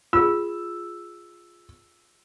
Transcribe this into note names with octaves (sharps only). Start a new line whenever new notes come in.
F4 G#4 E6